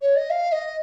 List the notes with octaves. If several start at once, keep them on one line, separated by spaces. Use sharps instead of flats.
C#5
D#5
F5
D#5